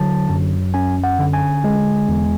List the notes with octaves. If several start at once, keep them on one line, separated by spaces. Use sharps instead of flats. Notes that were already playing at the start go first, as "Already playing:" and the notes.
Already playing: D3 F#3 A5
F#2
C#4 G#5
F#5
D3
G#5
G#3
E2